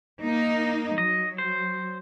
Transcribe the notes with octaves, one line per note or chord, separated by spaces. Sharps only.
A#3 D#4
F#3 D#5
C5